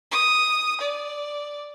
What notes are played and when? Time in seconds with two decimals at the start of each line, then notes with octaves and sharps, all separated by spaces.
0.11 D#6
0.81 D5